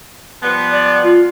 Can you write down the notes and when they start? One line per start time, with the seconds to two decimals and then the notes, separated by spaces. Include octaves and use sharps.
0.42 F3 G3 B3
0.71 D5
1.03 F4